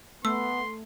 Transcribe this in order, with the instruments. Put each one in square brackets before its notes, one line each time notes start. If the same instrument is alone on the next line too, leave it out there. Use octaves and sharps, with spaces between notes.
[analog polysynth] A3 [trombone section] B3 [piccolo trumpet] C6 [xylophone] E6